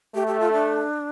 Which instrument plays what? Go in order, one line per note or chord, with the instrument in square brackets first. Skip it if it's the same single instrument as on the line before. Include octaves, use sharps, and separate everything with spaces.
[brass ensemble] A3 [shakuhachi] G4
[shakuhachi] G4
F4
D4